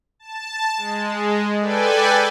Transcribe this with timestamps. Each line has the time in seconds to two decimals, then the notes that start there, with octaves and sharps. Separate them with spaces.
0.19 A5
0.77 G#3
1.60 A4 B4 D5 G5 G#5